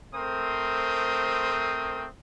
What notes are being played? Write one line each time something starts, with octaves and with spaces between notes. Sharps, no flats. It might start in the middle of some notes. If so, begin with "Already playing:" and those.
A3 C4 A#4 C5 D#6